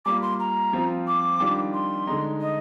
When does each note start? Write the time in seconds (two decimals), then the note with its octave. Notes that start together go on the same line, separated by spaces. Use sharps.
0.05 G3 A#3 F4 D6
0.22 C6
0.40 A#5
0.73 F3 C4 F4
1.07 D6
1.40 D#3 G3 D4 F4
1.74 C6
2.07 D3 G#3 D#4
2.41 D#5